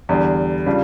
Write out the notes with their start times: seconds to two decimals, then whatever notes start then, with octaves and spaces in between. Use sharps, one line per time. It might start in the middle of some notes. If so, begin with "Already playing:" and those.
0.09 E2 D3 G3 D4
0.67 C#3 G3 D4 F4